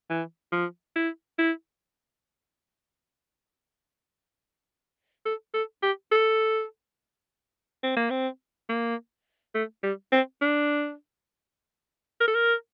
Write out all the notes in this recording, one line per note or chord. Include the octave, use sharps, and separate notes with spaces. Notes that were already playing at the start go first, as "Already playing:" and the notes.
E3
F3
E4
E4
A4
A4
G4
A4
C4
A#3
C4
A#3
A3
G3
C4
D4
A#4
A4
A#4